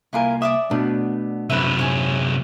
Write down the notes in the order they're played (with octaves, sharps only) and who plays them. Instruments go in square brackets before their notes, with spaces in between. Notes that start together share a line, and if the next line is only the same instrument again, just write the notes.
[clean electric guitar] C2 A#3 G#5 [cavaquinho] E4 F4 A#4
[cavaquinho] D5 D6 D#6 [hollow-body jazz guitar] E5
[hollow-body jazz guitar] B2 D4 [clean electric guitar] A3 B3
[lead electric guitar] F#2 C3 [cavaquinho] B4 E5
[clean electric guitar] A#2 [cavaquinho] C#5 G#5